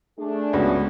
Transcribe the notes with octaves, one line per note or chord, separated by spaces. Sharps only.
A3 D4 G#4
C#2 B3 F#4